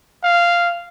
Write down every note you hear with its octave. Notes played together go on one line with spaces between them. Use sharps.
F5